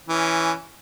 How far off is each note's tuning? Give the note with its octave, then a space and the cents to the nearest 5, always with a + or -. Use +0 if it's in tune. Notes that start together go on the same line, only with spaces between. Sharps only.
E3 +0 C#4 +0